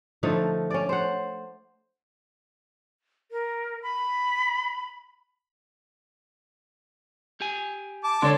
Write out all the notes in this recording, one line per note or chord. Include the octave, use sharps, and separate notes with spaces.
D3 F3 A3 D#4
C#4 D5
C5 F#5
A#4
B5
G4 G#5
A5 D6
D3 G#3 A4 C#5 D5 C6